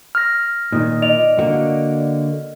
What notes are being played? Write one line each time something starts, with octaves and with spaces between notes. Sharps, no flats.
F6 A#6
A#2 D#3 D#4
D5 D#5 F7
D3 A#3 F#4